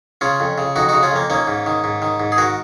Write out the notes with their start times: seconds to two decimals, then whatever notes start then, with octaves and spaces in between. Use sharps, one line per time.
0.21 C#3 C#4 F4
0.40 F2
0.58 C#3
0.76 F2 D#4 F#4
0.89 C#3 D#4 F#4
1.03 C#4 F4
1.12 F2 A#3
1.30 D#3 A#3 C#4
1.47 G#2
1.66 D#3
1.84 G#2
2.02 D#3
2.20 G#2
2.32 G#4
2.38 D#3 F#4 A#4